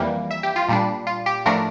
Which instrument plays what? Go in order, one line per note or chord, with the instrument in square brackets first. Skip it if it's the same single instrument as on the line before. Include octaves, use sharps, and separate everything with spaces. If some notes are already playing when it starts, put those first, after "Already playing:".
Already playing: [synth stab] F2 E3 G3 A#3
E5
G4
F4
A#2 G3 D4
F4
G4
A2 F3 A3 D4 A#4